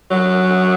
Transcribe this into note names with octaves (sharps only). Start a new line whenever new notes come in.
F#3